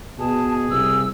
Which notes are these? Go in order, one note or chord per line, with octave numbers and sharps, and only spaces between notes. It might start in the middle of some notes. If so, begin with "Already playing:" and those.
B2 G#4 A5
C2 E6